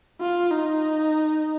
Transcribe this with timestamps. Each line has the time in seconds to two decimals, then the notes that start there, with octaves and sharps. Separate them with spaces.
0.21 F4
0.51 D#4